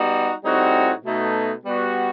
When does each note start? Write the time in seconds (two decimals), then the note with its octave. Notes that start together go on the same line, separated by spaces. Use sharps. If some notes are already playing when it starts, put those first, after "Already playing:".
Already playing: G3 B3 D#4 F#4
0.44 A2 G3 C4 D#4 F#4
1.04 B2 A3 D#4
1.65 G3 B3 F#4